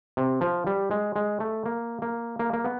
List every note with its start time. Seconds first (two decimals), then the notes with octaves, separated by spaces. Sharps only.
0.17 C3
0.41 F3
0.67 G3
0.91 G#3
1.16 G#3
1.40 A3
1.66 A#3
2.02 A#3
2.39 A#3
2.53 A#3
2.65 B3